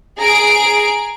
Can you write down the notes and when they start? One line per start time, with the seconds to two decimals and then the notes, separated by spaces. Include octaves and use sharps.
0.19 G#4 A#5 D7